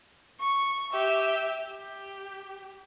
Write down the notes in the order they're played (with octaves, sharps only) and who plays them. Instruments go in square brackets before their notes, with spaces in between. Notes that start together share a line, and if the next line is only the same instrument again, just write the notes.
[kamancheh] C#6
G4 E5
G4